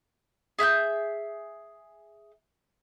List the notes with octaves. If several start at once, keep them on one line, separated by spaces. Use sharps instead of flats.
G#4 E5 F#6 G6